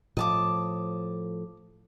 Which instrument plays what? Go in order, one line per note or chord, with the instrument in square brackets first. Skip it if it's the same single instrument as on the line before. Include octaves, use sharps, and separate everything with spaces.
[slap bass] A2 F3 [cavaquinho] D#5 A5 D6